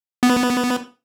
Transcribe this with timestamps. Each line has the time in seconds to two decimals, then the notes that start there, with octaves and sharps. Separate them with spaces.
0.23 B3